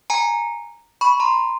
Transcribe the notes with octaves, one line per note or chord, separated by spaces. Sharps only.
G#5 A#5
B5 C#6
A#5 C6